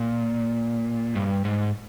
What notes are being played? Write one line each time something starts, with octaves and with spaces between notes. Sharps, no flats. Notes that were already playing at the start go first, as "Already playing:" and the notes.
Already playing: A#2
G2
G#2